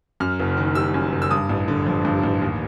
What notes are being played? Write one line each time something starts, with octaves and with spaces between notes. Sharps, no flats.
F#2 F6
F#1
D#3
G3 E6
F#2
F#1
E6
G2 D#6
A1
D3
F3
G2
A1
D#2